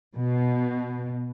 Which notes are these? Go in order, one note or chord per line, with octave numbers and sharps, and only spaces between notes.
B2